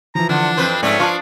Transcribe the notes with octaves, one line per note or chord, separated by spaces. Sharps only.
E3 F3 A#5
D3 D4
F2 B4 C5
F2 G#2 A3 C#4 D5
F3 D4 F4 F5 A5 C#6